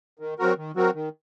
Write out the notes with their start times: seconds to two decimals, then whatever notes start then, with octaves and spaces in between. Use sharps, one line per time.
0.19 D#3
0.39 F#3 C4 F#4 A#4
0.57 D#3
0.75 F#3 C4 F#4 A#4
0.94 D#3